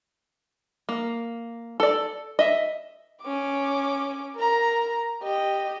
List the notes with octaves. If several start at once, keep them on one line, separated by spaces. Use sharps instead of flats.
A#3
A4 D5
D#5 E5
C#4 D6
A#4 A#5
G4 D#5